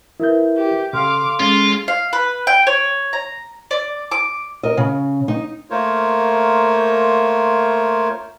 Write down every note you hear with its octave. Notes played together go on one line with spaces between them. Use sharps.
E4 A#4 B4 E5 G6
G4
C#3 A4 F5 C6 D6 F6
G#3 C#4 F4
F5
B4
G5
C#5
A#5
D5
D6
A#4 D#5
C#3
D#4
A3 A#3 F4 A#4 C5 C#5